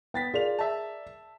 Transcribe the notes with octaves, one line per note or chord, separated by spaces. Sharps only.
B3 G5 A6 B6
F4 G#4 A#4 D5 F7
E5 A5